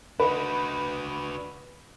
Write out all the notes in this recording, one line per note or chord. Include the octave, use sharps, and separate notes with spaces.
D4 F#4 B4 D#5